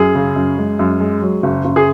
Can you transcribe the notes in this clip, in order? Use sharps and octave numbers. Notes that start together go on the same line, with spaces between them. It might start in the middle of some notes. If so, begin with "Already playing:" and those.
Already playing: F#2 G#4
C#3
F#2
G#3
F#2
G#3
F#3
F#1
F#1
G#4